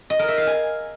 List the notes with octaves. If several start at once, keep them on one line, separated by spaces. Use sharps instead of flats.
D#5
A#4
E5
F5
G#5